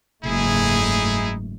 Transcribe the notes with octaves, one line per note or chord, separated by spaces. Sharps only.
F#1 G#2 A3 D#4 E4 G#4